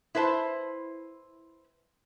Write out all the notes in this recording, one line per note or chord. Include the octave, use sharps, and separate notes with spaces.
E4 B4 C5 A5